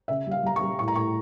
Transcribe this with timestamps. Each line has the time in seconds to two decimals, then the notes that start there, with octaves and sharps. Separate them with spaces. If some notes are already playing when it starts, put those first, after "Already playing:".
0.08 C#3 E5
0.27 G3 F5
0.43 G3 A#5
0.56 C#6
0.61 G3
0.79 A2 C#6
0.88 A#5
0.95 A2 C#6